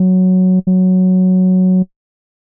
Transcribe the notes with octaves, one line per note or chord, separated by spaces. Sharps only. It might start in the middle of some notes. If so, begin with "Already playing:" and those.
Already playing: F#3
F#3